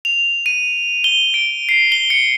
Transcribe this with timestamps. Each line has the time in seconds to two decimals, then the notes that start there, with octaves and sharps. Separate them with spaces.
0.05 F7
0.46 D#7
1.04 G7
1.34 D7
1.69 C7
1.92 G7
2.10 C#7